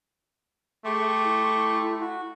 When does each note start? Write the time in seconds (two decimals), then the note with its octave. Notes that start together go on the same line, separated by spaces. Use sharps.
0.85 A3 G4 G#4 C6 C#6
1.23 E4
2.01 F#4